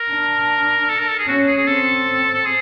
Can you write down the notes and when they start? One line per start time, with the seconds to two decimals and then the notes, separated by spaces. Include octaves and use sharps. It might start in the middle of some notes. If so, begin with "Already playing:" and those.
Already playing: A#4
0.11 D4
0.89 A4
0.99 A#4
1.09 A4
1.19 G#4
1.28 C#4 F#4
1.47 G#4
1.57 G#4
1.67 C4 A4
2.34 A4
2.45 G#4